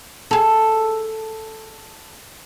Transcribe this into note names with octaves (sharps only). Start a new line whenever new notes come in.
G#4 A4